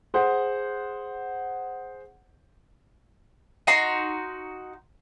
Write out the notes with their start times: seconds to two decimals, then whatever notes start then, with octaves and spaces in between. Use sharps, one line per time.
0.14 G#4 C5 F#5
3.67 D#4 F#4 A#5 C6